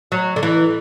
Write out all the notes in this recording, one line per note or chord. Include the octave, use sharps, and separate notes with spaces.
F#3
D3
E3